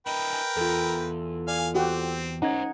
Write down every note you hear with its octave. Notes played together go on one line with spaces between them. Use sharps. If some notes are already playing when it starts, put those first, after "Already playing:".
E4 A#4 B4 D#5 G5
G#5
E2 F4 A4
D5 F5 G#5
C4 F#4 G4 F#5
C#4 D#4 C5 F#5 G#5 A#5 G#6